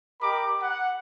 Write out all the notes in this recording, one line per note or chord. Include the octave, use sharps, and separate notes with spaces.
G4 A#4 D#5 A#5 B5 D6
F#5